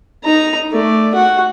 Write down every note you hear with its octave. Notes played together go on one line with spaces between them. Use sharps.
D#4 A#5
A3 D5
F#4 F#5